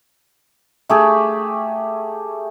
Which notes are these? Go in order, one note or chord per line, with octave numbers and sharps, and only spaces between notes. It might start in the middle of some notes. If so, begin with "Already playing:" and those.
A3 G4 G#4